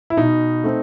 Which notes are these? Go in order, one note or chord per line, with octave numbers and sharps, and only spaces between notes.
E4
B2 D#4
A3 C4